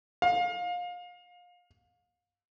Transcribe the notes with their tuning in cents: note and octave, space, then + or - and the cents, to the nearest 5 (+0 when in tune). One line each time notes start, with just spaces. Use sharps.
F5 +30